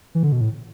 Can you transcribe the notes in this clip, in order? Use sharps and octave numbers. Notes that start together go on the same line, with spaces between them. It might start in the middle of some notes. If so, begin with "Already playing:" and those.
E3
D3
B2
A2